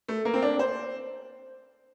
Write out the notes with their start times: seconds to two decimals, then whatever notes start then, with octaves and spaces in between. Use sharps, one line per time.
0.08 A3
0.25 A#3
0.34 C4
0.42 D4
0.59 C5